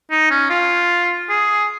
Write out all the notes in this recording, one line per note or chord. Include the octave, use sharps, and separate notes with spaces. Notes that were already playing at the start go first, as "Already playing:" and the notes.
D#4
C#4
F4
G#4